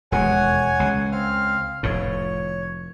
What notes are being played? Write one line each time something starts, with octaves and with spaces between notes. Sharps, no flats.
E1 D#2 G#3 C#5 F#5 G#5
C#2
C4 F5 F6
F1 A2 C#5